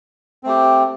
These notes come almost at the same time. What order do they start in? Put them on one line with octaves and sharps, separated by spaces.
C4 A3 G4